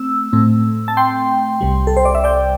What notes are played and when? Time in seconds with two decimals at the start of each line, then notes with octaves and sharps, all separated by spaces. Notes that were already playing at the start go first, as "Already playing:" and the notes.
Already playing: A3 C4 E6
0.33 A2 A3 C4
0.88 A5
0.97 G5 C6
1.61 C2 C3 G3
1.87 A4
1.97 C5
2.05 D5
2.15 E5
2.24 D5 G5